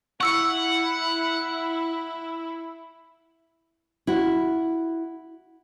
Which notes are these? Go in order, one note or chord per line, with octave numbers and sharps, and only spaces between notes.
E4 F#5 C#6 E6 C#7
E4 F#4